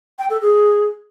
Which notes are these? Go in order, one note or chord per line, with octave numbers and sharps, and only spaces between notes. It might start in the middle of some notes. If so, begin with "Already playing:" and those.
G5
A4
G#4